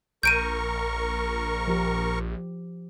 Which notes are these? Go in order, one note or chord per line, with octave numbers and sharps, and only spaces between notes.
A#1 A#4 C#6 G6 D7 D#7
F3 G4